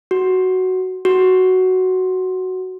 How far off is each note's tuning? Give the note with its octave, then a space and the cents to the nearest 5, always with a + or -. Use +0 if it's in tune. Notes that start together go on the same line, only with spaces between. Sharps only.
F#4 +5
F#4 +5